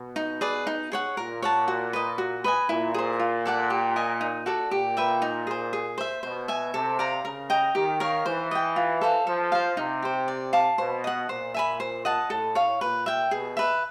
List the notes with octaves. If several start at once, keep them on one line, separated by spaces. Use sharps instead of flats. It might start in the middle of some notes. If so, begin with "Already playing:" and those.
Already playing: B2
D#4
G#4 B4 D5
D#4
G#4 C#5 F#5
A#2 A#4
C#5 F#5 A5
F#4
B4 D#5
F#4
B4 D#5 G#5
A#2 E4
G#4 C5
F4
A4 D5 F#5
G4
A#4 D#5 G#5
D#4
F#4 A4 D5
A#2 G4
B4 E5 G5
D#4
G#4 C5
G#4
C5 E5
B2 C5
E5 G#5
C3 A4
D5 F5 A#5
C#3 A#4
D#5 G5 A#5
D#3 G4
A#4 C#5 F5
E3 C5
D#5 G5
F4
A4 C5 F5
F3 A4
C5 F5
C3 D#4
G4 C5
D5
F5 A5 D6
B2 C5
D#5 F#5
A#2 C5
E5 G#5 B5
C5
D#5 F#5 A5
A2 A4
C#5 F5
A#2 B4
E5 G5
B2 G#4
B4 E5